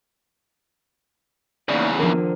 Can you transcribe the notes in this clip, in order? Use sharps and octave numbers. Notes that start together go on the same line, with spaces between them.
E2 C#3 A#3 D#4 D5
D#3 F3 D4 A#4